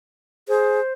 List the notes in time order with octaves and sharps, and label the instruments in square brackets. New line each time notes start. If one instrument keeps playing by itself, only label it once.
[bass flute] G#4 [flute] C5